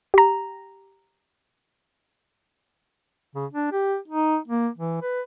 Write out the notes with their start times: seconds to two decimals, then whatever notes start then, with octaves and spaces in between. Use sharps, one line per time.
0.14 G4 A#5
3.35 C#3
3.53 D4
3.72 G4
4.08 D#4
4.48 A#3
4.78 E3
5.02 B4